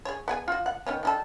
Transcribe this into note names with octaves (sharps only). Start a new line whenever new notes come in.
G#4 C#5
B3 G#4 G#5
F4 F#4
F#5
D#3 B3 C#4
D#3 G3 A4